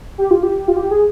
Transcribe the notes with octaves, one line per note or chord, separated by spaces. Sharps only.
G4
F4
G4
F4
G4
G#4